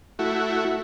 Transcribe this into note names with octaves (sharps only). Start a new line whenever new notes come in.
A3 E4 F#4